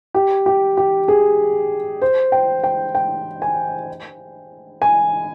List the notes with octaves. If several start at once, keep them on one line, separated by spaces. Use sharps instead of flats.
G4
G4
G4
G#4
C5
G5
G5
G5
G#5
G#5